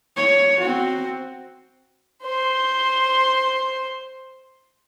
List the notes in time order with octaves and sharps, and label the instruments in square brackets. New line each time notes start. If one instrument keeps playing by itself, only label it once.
[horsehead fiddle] C#5
C4 F#4
[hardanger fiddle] C5 C6